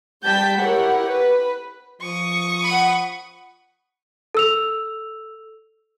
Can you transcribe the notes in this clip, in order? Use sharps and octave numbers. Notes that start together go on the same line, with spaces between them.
G3 G4 A5 G6 B6
E4 G4 A#4 C#5 F#5
B4
F3 C#6 D#6 C#7
F#5 B5
A4 E6 F7